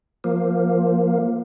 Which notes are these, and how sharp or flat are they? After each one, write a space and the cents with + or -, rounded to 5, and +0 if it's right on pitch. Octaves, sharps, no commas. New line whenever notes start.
F3 +0 A#3 +0